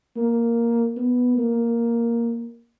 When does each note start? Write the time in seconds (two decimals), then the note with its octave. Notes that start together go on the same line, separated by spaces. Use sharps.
0.16 A#3
0.97 B3
1.37 A#3